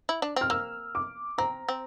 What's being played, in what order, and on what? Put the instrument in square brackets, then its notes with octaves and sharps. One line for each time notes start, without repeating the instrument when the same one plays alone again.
[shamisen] E4
D4
[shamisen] C4 [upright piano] F6
[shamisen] A#3 [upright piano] E6
[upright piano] D6
[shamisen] C4 [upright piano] A#5
[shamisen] C4